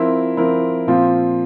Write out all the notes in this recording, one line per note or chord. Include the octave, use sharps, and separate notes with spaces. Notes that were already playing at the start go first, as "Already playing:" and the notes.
Already playing: F3 C4 E4 A#4
F3 C4 E4 A#4
A#2 F3 C4 F4